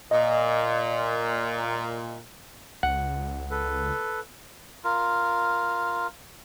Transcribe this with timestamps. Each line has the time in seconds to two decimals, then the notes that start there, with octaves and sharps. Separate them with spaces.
0.11 A#2 D#5
2.83 C#2 F#5
3.51 A4 B4
4.84 F4 A#4